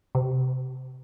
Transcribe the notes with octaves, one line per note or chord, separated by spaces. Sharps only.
C3